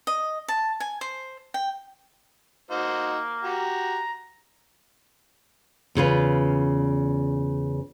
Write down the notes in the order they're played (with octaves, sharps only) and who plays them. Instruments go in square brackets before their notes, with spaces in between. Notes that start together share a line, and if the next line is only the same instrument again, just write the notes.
[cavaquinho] D#5
A5
G#5
C5
G5
[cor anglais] A#3 [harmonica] D#4 F#4 C5
[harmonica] F#4 G4 [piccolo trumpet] A#5
[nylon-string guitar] E2 C#3 F4 B4